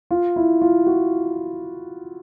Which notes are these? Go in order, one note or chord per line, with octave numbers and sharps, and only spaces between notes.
F4
E4
F4
F#4